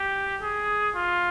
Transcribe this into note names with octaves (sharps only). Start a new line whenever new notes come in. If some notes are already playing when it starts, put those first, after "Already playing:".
Already playing: G4
G#4
F4